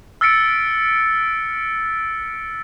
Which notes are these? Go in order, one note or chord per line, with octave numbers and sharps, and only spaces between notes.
E6 F6 A6 B6 C#7 D7